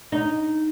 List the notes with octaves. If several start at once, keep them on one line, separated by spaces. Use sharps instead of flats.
D#4